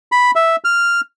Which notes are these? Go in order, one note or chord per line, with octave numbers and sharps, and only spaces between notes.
B5
E5
F6